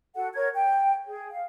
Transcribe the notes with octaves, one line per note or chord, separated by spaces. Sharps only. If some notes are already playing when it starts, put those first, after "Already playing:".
F#4 A4 F#5
A#4 C#5 G#6
G5
G#4
F5